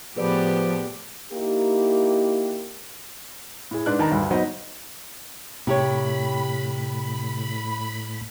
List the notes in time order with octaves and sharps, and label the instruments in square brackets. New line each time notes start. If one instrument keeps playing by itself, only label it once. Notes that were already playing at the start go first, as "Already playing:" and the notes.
[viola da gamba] A2 B3 G4 [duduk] F3 [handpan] G#4 B4 D5
[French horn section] A#3 D#4 E4 G4
[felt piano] A2 G#4
G#2 D4 B4 F#6
D#3 A5 A#5
D2 G2
F#3 B3 D#4 B4 C5 D#5
[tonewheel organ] A2 B5 [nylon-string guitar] C3 G4 C#5